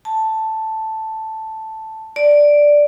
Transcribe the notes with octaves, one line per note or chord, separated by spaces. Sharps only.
A5
D5